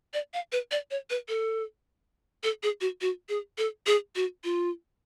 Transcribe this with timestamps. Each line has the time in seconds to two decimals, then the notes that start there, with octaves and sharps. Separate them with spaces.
0.14 D5
0.34 F5
0.52 B4
0.71 D5
0.91 C#5
1.10 B4
1.29 A4
2.43 A4
2.63 G#4
2.81 F#4
3.01 F#4
3.29 G#4
3.58 A4
3.87 G#4
4.16 F#4
4.44 F4